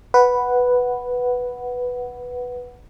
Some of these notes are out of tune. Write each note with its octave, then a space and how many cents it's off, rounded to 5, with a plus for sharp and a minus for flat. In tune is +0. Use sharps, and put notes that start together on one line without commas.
B4 +0 F#5 +0